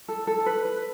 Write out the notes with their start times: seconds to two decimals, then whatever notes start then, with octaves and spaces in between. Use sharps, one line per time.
0.08 A4
0.27 A4
0.46 B4
0.65 B4